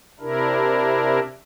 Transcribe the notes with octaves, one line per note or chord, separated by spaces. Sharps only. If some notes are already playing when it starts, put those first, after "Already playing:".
C3 D4 E4 A#4